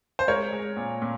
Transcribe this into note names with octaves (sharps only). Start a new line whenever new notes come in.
C5
G#3 A#4 C#5
G#3
A#2
A#2